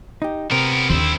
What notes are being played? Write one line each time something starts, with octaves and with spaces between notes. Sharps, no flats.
D#4 G4
C3 B3 A#4
D#2 D3 C4 E4